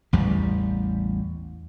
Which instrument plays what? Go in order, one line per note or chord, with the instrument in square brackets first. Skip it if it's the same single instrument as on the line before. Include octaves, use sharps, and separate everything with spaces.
[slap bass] A1 E2 G3